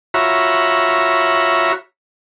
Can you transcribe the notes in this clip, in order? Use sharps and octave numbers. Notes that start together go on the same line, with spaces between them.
F4 F#4 C#5 E5 A#5 B5